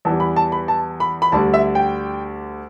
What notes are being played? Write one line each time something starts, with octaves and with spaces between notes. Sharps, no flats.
E2 E3 G3 A5
B5
A5
B5
A5
B5
B5
D2 D3 G3 A5
E5
G5